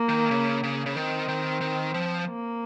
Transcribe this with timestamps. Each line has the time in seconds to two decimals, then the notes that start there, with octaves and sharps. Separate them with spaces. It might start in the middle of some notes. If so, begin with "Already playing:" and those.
Already playing: A#3
0.09 D#3
0.31 C#3
0.63 C#3
0.86 C#3
0.96 D#3 C4
1.28 D#3
1.61 D#3
1.94 F3
2.27 A#3